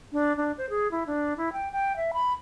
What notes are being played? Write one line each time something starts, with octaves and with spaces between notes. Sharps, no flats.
D4
D4
C5
G#4
E4
D4
E4
G5
G5
E5
B5